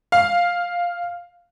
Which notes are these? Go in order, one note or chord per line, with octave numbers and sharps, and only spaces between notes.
F5